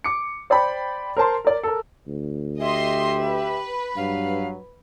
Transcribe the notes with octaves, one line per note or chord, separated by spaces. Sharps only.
D6 C#7
C5 D5 G5 B5
A#4 C5 A5 C6
A#4 D5
A4 A#4
D2
G4 D#5 E5 C6
B4
G2 F#3 F5